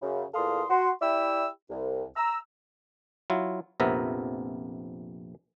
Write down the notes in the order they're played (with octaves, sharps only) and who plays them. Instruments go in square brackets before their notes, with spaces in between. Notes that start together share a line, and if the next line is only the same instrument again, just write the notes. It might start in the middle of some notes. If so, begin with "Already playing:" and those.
[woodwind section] F#2 C#3
E2 A#2 A4 F5 C6 D#6
F#4 C6
E4 G4 D5 E5 B5 E6
C2
A#5 E6
[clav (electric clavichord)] F#3 E4 F4
A#1 F2 C3 B3 A#4 E5